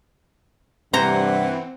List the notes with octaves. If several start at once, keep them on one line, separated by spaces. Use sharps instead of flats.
G2 C3 E3 C4 C5 F#5 A#5